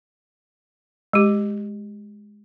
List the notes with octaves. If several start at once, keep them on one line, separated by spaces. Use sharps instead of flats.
G#3 G4